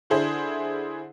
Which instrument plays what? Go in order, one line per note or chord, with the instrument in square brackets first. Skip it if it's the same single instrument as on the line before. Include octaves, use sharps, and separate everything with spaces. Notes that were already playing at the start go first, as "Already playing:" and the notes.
[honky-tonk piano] D3 D4 E4 G#4 C5